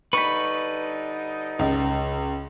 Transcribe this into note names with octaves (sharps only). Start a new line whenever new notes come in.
D3 G3 D#4 B4 B5 C#6
C#2